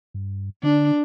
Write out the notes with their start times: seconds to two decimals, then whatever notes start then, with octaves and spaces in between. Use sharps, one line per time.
0.14 G2
0.63 D3 D4